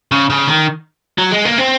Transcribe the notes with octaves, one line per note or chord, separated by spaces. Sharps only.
C#3
C#3
D#3
F#3
G#3
A#3
C4